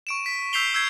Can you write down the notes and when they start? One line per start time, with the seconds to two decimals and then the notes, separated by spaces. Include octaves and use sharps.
0.07 C#6 D7 E7
0.26 B6
0.53 E6 G6 B6 C7 F7 G7
0.74 E6 G6 G#6 C7